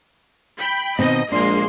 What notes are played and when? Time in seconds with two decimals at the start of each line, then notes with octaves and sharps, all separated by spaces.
0.59 G5 B5
0.99 B2 D#3 C4 D#5
1.32 A#1 G#3 A#3 D4 C6 C7